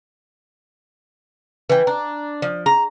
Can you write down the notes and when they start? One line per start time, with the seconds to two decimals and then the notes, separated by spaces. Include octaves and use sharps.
1.70 E3 B4 G5
1.87 D4 A#5
2.42 F3 D5
2.66 G#4 A#5